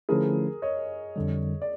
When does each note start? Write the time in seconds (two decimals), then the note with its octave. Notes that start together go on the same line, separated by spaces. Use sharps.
0.09 D3 F3 A3 C#4 E4 G#4 A#4
0.62 C#5 D#5
1.16 F2 D3 G3
1.62 D5